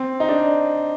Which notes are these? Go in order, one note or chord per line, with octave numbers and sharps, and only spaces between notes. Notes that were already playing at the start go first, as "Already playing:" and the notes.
Already playing: C4
D#4
D4